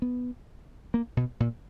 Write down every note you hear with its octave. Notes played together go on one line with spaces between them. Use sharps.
B3
A#3
B2
A#2